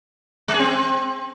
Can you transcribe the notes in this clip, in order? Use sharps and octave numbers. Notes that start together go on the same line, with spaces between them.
G#3
G#4
C4